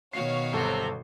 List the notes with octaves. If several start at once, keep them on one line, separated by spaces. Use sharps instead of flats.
B2 D#3 F#4 C#5 F5 C7
G1 C3 F#3 A4